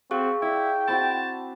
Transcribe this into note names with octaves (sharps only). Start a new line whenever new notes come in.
C4 F#4 G#4 F5 C#6
E4 D5 E5 G5
C4 E4 F#4 A5